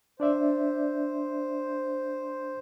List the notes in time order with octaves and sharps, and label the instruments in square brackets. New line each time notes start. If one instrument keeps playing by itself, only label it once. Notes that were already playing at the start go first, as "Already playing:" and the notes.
[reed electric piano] D4 D5 E5 [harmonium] C5